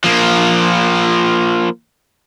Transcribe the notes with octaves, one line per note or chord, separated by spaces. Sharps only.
F3 A#3